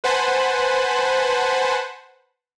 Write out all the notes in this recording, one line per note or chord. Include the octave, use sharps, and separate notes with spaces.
B4 C5 F#5 G#5 A5 B5